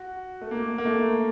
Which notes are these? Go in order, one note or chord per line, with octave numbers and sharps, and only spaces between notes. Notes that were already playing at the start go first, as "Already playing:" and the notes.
Already playing: F#4
A3
A#3
A#3
A3